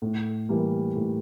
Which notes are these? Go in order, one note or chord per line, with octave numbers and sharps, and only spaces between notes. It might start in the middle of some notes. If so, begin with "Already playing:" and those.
A2
E3 G3 A#3
A2